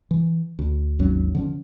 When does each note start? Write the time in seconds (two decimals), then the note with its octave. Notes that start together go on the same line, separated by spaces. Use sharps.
0.11 E3
0.59 D2
0.99 G#1 D#2 F#3 C#4
1.35 D3 F3 C#4